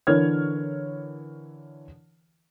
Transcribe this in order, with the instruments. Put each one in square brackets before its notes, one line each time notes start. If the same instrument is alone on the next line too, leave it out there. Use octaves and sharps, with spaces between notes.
[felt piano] D3 E3 A#4 C#5 F6 G#6